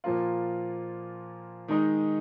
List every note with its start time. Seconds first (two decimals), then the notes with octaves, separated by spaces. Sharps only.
0.04 A#2 F3 A#3 F4
1.68 D#3 G#3 D#4